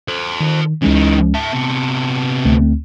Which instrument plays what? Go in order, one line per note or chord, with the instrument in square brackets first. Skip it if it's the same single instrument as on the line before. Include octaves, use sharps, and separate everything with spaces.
[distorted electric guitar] A4 C5
[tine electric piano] D#3
[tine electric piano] C#2 G#3 C#4 [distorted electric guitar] E3 D#4
[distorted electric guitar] G#2 E5 [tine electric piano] A5
[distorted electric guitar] C3 B3
[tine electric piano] D2 A3 C4